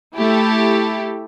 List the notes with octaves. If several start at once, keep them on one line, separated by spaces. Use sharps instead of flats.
A3 E4 G4 A4